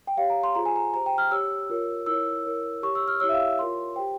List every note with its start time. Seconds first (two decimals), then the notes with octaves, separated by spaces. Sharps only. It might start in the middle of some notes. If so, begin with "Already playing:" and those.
0.07 G5
0.17 G4 C#5 F5
0.30 A#5
0.43 C6
0.55 F4 G#4 C5 A#5
0.65 G#5
0.76 A#5
0.94 G4 C5 A#5
1.06 G5
1.18 F6
1.31 G4 C#5 E6
1.70 F4 A#4 C#5
2.06 E4 A#4 C#5 E6
2.44 E4 A#4 C#5
2.83 G4 C#5 C#6
2.95 E6
3.08 F6
3.20 E4 G4 C#5 E6
3.29 E5
3.33 F5
3.59 F4 A#4 C#5 C6
3.96 G4 C5 G5